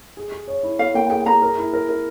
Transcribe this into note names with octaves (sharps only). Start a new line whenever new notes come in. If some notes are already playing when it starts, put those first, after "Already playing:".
G#4
G#4
C#5
E4
C#5 F5
A#3 G5
G#4 G5
G#4 A#5
A#4
E4
A#4
A#4